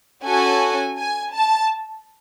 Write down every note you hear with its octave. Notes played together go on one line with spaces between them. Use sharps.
C#4 F#4 A4 G#5
G#5
A5